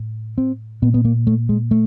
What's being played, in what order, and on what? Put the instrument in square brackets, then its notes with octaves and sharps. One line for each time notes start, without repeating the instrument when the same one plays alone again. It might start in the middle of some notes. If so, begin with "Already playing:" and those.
Already playing: [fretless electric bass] A2
C4
A#2 B3
B3
A#3
A3
G#3
A3